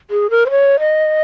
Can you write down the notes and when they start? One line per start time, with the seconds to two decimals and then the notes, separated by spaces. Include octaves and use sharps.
0.10 G#4
0.30 A#4
0.46 C5
0.50 C#5
0.80 D#5